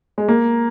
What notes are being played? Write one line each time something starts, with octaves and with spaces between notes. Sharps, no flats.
G#3
A#3